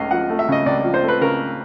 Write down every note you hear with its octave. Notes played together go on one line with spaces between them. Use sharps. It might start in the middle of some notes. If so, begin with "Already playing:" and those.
Already playing: C#2 C#3 A3 D#5 F5
F3 F#5
A3
E5
C#3 D#5
C#2 D5
F3
C5
A3
B4
C#3 A#4